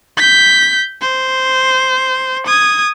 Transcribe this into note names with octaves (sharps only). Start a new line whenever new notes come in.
G6 B6
C5
D#6 G#6